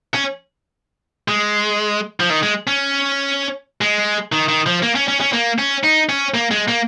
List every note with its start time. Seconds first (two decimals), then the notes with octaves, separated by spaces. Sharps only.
0.14 C#4
1.28 G#3
2.20 F3
2.30 D#3
2.43 G#3
2.67 C#4
3.81 G#3
4.32 D#3
4.48 D#3
4.66 F3
4.82 A#3
4.95 C#4
5.08 C#4
5.21 C#4
5.33 A#3
5.59 C#4
5.84 D#4
6.09 C#4
6.34 A#3
6.51 G#3
6.68 A#3